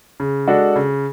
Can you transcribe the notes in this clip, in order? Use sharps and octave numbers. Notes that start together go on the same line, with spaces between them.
C#3
G#3 D4 F#4 A4
C#3